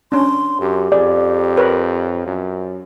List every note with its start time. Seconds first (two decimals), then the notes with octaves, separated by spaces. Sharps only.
0.12 C#4 D4 C6
0.61 F#2 G4
0.92 F2 G#4 D5
1.57 A#4 B4 C#5
2.26 F#2